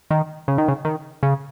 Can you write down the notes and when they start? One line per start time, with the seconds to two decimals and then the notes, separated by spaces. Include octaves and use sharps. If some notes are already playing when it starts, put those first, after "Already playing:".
0.10 D#3
0.48 C#3
0.58 D#3
0.68 C#3
0.85 D#3
1.23 C#3